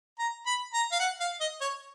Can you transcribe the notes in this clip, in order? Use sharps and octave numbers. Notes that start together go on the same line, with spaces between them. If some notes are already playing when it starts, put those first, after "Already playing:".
A#5
B5
A#5
F5
F#5
F5
D#5
C#5